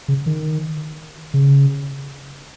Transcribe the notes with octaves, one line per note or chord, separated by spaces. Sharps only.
C#3
D#3
C#3